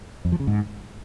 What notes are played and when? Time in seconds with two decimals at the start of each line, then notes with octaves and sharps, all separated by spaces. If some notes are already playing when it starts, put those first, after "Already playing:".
0.25 F2
0.32 F3
0.40 C#3
0.47 G#2